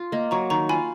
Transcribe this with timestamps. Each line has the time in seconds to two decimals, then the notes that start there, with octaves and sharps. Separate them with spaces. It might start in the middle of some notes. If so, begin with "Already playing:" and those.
Already playing: F4
0.12 A#3 D#5
0.31 F#3 A#5 C#6
0.50 D#3 A#5 C#6
0.69 F4 G#5 B5